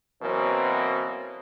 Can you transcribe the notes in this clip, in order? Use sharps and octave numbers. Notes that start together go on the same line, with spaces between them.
B2 E3 F#3 A#3 C4 A#4